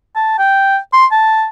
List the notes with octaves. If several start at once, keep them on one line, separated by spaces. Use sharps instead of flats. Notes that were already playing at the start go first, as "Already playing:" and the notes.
A5
G5
C6
A5